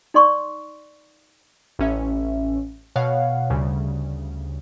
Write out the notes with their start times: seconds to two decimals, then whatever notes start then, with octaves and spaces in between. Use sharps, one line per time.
0.14 D#4 D5 C6 C#6
1.79 A1 C#4 E5
2.96 B2 C#5 F5 F#5
3.50 D2 C#3 G3